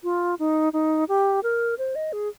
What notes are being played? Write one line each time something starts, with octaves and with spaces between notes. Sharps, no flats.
F4
D#4
D#4
G4
A#4
C5
D#5
G#4